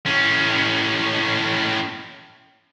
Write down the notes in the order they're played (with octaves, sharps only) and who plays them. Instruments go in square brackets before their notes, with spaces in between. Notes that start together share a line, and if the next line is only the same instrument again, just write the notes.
[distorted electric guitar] A2 C#4